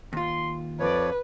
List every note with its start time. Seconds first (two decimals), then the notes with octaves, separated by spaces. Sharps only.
0.13 D#2 F4 C6
0.80 F2 F3 B4 C#5 D5